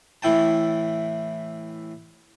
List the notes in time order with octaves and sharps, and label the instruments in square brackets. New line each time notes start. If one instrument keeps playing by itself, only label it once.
[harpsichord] A2 E3 E4 G5 A5